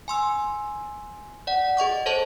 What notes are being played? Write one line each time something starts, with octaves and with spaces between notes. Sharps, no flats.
G#5 C6 E6
D5 F#5
G#4 D#5 C#6 D6
A4 C5 C#5 D#5 A5